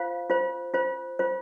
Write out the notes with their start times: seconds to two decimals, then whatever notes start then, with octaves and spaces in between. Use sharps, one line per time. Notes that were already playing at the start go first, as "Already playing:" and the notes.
Already playing: F4 C5 F5
0.30 F4 C5
0.74 F4 C5
1.19 F4 C5